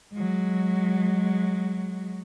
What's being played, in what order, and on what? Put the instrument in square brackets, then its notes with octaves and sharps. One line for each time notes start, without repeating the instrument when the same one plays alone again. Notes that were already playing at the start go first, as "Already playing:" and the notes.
[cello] F#3 G#3